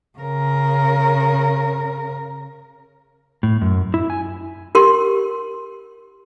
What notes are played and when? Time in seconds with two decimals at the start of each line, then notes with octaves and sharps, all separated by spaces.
0.19 C#3 A#4
3.43 A2
3.61 F#2
3.94 E4
4.10 G#5
4.75 G4 A#4 C6